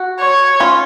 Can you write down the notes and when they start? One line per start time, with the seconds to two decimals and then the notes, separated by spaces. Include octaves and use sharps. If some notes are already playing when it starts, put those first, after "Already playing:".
Already playing: F#4
0.20 C#5
0.60 C#4 F4